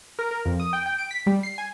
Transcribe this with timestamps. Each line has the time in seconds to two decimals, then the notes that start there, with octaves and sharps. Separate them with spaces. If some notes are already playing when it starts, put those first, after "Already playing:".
0.19 A#4
0.31 A#4
0.45 F2
0.60 D#6
0.73 G5
0.86 G5
0.98 D7
1.11 B6
1.26 G3
1.43 C7
1.58 G#5